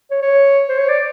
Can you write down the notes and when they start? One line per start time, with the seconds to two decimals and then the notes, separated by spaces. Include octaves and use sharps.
0.11 C#5
0.22 C#5
0.69 C5
0.78 C#5
0.89 D5